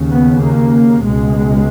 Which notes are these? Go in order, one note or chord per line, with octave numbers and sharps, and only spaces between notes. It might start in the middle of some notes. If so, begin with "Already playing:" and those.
Already playing: D#2 C#3
B3
A#3
C#2 B2 G#3